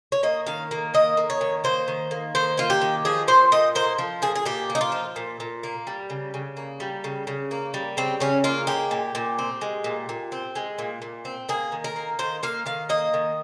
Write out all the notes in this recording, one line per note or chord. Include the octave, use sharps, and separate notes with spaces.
C#5
A#3 D#5
D#3 F5
A#3
D#3 D#5
A#3
C#5
D#3
A#3 C5
D#3
A#3
D#3 C5
A#3 F4
G4
D#3
F3 G#4
A#2 C5
A#2 D#5
A#3 C5
F3
A#2 G#4
G#4
A#2 G4
A#3
D#4
F4
F3
A#2
A#2
A#3
G3
C#3
C#3
A#3
G3
C#3
C#3
A#3
G3
C#3 C4
C#3 C#4
A#3 F4
G#3 G4
A#2
A#2
C4
G#3
A#2
A#2
C4
G#3
A#2
A#2
C4
A#3 G#4
D#3
A#4
A#3
D#3 C5
A#3 F5
D#3 F5
A#3 D#5
D#3